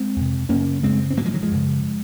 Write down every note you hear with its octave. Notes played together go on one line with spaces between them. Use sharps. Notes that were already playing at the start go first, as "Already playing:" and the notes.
Already playing: G#3 C4
F2 C3
F#2 C#3 A#3 C#4
F#2 C#3 G#3 C4
C4
G#2 F#3 A#3
F3 G#3
D#3 F#3
F3 G#3
F#2 C#3